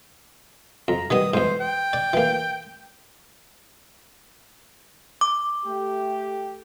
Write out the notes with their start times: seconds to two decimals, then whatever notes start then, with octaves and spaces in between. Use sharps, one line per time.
0.88 F2 A#5
1.10 D#3 G3 B3 D#6
1.34 E2 G#2 C5
1.60 G5
1.93 D5
2.13 E3 A#3
5.21 D6
5.66 A3 G4